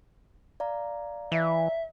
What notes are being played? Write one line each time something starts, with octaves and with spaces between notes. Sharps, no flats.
D5 F5 A#5
E3 E5